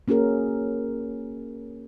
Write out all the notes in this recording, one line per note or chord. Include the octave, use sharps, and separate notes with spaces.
A#3 C#4 F#4 G#4 A#4